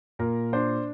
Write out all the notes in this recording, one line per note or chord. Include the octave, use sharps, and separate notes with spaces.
A#2 A#4
D4 C5